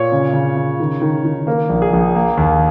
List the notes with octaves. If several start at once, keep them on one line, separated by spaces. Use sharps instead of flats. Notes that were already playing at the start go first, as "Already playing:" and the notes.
Already playing: A#2 C#5
C#3
C#3
C#3
D#3
D#3
D#3
A#3 A#4
A#1
G#4
A#1
A#3
D#2